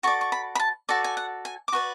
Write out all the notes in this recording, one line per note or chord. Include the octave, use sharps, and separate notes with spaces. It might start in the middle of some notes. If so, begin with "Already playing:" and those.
F#4 A4 D5 C#6
C#6
B5
B5
A5
F#4 A4 D5
G#5
F#5
G#5
D6
F#4 B4 D5 C#6